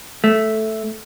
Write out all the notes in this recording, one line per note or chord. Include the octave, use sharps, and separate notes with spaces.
A3